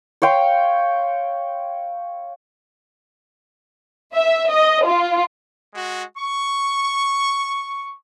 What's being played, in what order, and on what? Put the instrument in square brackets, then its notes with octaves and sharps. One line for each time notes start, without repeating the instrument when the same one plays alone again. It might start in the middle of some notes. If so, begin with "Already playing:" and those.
[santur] C#5 F5 G5 C6
[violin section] E5
D#5
F4
[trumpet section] G#3 F#4
C#6